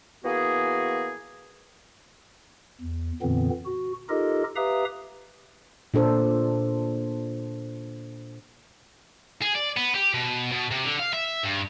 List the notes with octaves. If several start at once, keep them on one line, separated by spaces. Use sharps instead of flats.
E3 A#3 B3 F#4 G#4
E2
F2 A#2 D3 E3 B3 C4
F#4
D#4 F4 G4 A4 A#4 D#5
G4 B4 E5 F5 A#5 D#6
A#2 D4 A4 C5
G#4
D5
B3
G4
B2
B2
C3
D3
F5
E5
G2